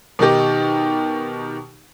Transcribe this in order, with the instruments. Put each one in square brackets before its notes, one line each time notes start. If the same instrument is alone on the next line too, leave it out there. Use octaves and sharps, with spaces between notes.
[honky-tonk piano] B2 D#3 D#4 G4